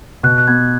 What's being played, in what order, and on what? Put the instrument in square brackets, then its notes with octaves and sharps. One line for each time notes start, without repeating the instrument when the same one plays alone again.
[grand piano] B2 [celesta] F#6
[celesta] F#6
[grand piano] B3 [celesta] G#6